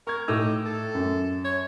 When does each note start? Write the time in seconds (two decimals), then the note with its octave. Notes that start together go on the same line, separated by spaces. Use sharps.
0.07 A#4 C#6 G#6
0.28 A2 D#4 D6 E6
0.65 A4
0.95 F#2
1.45 C#5